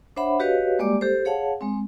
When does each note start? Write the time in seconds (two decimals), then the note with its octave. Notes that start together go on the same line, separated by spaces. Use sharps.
0.16 D4 C5 C#5 E5 F#5 B5
0.40 F#4 G4 B4 C#5 D#5 F5
0.79 G3 G#3 A#3 G4 D5 D6
1.01 G4 A4 C5
1.25 G#4 C#5 F5 F#5 A5
1.61 G#3 C4